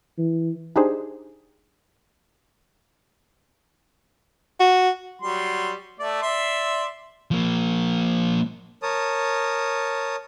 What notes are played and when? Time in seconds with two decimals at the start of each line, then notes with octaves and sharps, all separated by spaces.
0.18 E3
0.76 D4 D#4 G4 G#4 C5
4.60 F#4
5.22 F#3 G3 C6
5.99 A3 D5
6.22 D5 E5 C6
7.31 F3 A#3
8.82 A#4 C#5 A5 D#6